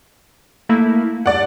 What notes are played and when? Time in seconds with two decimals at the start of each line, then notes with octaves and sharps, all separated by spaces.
0.69 A3 A#3 E4
1.26 G2 D5 F#5